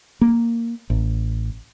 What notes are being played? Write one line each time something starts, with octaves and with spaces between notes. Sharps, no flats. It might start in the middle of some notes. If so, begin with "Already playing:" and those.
A#3
A1